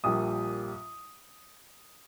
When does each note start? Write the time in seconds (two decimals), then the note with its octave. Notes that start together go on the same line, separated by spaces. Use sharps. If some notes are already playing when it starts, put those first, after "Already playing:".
0.04 A#1 A#2 G3 D#6